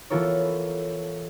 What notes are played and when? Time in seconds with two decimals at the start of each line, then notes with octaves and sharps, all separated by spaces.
0.10 E3 B3 F4 A4 A#4 C#5